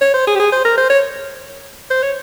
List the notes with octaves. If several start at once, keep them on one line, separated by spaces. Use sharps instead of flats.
C#5
C5
G#4
G4
G#4
C5
A#4
C5
C#5
C5
C#5